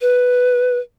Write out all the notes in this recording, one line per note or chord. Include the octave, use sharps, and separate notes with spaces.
B4